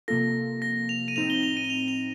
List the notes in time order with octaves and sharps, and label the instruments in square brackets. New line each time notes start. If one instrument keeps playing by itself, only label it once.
[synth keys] C3 F3 A#3 F4 A4 [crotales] A#6
[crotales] A#6
F7
D#7
[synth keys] A2 F3 C4 D#4 [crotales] F7
[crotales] G7
F7
D#7
G7
F7
F7